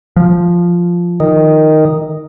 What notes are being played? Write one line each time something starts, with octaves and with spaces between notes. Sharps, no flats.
F3
D#3